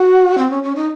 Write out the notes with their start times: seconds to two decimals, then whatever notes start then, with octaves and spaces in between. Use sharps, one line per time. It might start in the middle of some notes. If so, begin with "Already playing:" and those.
Already playing: F#4
0.38 C4
0.50 C#4
0.63 C#4
0.76 D#4